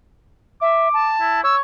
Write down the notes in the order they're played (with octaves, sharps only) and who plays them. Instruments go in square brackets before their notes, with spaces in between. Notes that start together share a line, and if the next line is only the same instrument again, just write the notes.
[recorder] E5 [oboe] D6
[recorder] A5
[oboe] E4
[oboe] C#5 [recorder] E6